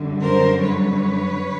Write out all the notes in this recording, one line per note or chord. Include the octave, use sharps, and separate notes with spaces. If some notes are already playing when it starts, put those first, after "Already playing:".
Already playing: F#2 D3 G3
A#4 C5
B4 C#5